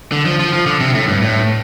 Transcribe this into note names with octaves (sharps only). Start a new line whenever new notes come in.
D3
F3
F3
F3
D3
C3
A2
G2
A2